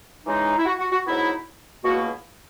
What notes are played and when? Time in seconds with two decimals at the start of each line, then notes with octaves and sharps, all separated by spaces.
0.26 C#3 E3 G#3 D#4
0.58 E4
0.66 F#4
0.79 F#4
0.91 F#4
1.05 G#2 F#3 B3 D#4 E4
1.84 C#2 B2 A#3 E4 F#4